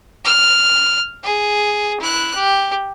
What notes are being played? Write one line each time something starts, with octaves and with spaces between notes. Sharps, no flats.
F6
G#4
E4 F#6
G4